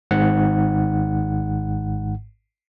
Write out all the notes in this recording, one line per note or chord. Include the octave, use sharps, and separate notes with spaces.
G#1 G#2 F#5